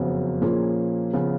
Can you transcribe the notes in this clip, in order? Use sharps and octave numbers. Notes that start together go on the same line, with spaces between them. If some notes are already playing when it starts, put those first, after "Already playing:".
Already playing: F#1 F2 C#3 F#3 B3
A#2 F3 A#3 C#4 G#4
C#3 F3 B3